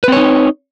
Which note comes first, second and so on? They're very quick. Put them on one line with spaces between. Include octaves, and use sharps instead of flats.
B4 C4 C#5 D#4